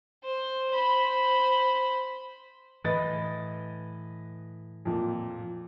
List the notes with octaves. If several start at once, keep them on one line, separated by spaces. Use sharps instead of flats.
C5
C5 B5
A2 E3 B4 D#5 A6
F2 A#2